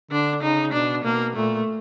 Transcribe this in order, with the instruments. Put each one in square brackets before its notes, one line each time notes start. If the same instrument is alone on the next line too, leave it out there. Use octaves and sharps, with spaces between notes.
[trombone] D3 [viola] D4
[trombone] C#3 [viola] D#4
[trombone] B2 [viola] D4
[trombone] B2 [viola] A#3
[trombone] A#2 [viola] A3